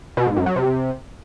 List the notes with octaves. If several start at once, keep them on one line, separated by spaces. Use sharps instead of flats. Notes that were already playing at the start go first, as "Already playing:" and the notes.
B2
G#2
F#2
F#3
C3